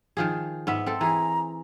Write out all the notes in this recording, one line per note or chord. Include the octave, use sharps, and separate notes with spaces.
D#3 F3 G#4
G#2 B3 E5
C4 A4
E3 G#4 A#5